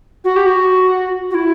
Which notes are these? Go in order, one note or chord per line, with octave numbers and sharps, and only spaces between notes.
F#4
G4
F#4
F#4
E4